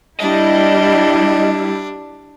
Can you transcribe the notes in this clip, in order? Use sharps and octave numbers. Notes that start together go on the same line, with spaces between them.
G3 D4 E4 D#5